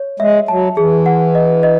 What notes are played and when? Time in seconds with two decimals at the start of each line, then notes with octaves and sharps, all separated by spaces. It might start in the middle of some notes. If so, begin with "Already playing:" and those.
Already playing: C#5
0.20 G#3 E5
0.48 F#3 A5
0.77 E3 G#4
1.06 F#5
1.35 D#5
1.63 D#5